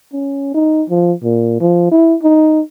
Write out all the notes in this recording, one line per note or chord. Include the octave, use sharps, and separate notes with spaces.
C#4
D#4
F3
A#2
F3
E4
D#4